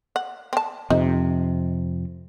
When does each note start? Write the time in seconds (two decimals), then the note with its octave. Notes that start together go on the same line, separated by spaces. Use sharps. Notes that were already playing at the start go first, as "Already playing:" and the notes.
0.16 F#5
0.53 C4 A5
0.90 F2 C3 D#4